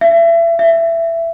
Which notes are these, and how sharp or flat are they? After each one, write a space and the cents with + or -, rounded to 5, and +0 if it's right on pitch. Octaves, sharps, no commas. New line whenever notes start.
E5 +30
E5 +15